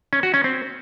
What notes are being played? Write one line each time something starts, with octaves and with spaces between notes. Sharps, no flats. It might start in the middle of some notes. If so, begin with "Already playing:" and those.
C#4
F#4
C#4
C4